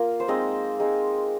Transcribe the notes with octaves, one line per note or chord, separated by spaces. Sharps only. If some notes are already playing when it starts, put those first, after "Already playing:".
Already playing: A#3 F4 A#4
C5
G#3 C4 D#4 D#5
G#3 C4 D#4